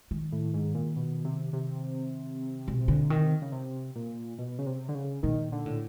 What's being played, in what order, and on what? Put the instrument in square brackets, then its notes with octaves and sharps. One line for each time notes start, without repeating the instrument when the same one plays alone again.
[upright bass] D#3
[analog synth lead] A2
G#2
A#2
B2
C3
C3
[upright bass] B2
D3
D#3
[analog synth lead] C#3
C3
A#2
B2
C#3
C3
D3
C#3
[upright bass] A#2 [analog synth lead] D#3
[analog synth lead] D3
[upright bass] A2